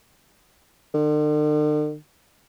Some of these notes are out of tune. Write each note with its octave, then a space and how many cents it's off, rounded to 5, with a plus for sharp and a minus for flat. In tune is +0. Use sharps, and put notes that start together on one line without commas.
D3 +45